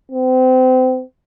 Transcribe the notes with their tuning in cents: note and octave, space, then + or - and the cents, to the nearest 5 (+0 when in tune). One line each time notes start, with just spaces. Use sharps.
C4 -30